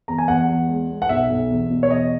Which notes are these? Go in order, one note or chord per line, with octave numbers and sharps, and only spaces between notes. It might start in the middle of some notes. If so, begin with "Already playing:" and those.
E2 A#5
G#5
E2 F#5
E2
G#3
G#3
F#5
B1 E5
B1
E2
B2
C#5
E2 D#5